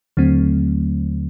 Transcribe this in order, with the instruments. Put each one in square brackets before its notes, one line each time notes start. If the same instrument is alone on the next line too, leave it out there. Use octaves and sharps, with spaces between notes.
[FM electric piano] D#2 D3 F#3 A3 C4